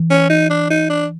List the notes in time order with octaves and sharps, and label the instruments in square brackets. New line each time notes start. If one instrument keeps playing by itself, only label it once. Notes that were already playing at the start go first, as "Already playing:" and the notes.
Already playing: [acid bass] E3
[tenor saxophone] C#4
D#4
D4
D#4
D4